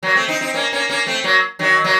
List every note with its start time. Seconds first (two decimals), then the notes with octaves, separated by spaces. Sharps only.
0.03 F#3 A#3
0.15 A3 C4
0.28 C4 D#4
0.41 C4 D#4
0.54 A#3 C#4
0.72 A#3 C#4
0.89 A#3 C#4
1.07 A3 C4
1.24 F#3 A#3
1.59 D#3 F#3
1.84 F#3 A#3